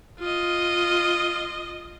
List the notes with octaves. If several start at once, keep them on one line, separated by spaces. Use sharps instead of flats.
F4 D#5